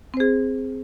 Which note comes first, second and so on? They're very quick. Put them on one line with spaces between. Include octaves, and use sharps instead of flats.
C4 C5 G#4